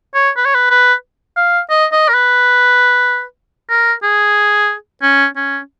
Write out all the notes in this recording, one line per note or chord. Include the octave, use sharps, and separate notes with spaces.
C#5
B4
C#5
B4
B4
F5
D#5
D#5
A#4
B4
A#4
G#4
C#4
C#4